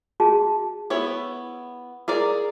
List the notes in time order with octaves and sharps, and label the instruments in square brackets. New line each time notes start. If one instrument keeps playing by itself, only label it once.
[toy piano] F#4 G#4 A5
[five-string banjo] B3 E4 C#5
G#4 A#4 D5